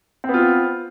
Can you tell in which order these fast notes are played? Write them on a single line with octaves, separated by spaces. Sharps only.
C4 B3 F4